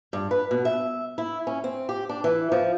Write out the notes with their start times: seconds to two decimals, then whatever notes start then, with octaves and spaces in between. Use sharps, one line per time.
0.13 G2
0.31 B4
0.51 B2
0.65 E5
1.18 E4
1.47 C#4
1.64 C4
1.89 G4
2.09 D4
2.24 E3
2.52 F3